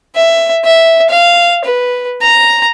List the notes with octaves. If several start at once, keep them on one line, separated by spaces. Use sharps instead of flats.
E5
E5
F5
B4
A#5